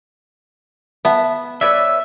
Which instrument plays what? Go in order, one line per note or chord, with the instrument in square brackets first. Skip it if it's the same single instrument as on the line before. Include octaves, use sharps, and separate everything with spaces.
[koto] B3 [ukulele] E5 A5
[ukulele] B4 C#5 D5 [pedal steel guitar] E5